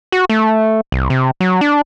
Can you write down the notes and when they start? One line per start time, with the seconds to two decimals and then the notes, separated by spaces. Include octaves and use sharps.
0.12 F#4
0.29 A3
0.92 C2
1.10 C3
1.40 F#3
1.61 D4